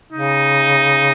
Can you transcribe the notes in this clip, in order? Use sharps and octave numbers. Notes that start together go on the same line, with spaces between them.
C#3 D#4